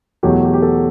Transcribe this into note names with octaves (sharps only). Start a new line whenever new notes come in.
E2 B2 F#3 A3 G4
G4
G4
A4